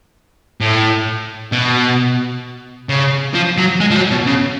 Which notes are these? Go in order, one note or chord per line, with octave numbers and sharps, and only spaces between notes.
A2
B2
C#3
F3
F#3
G#3
F3
F#3
B2
C#3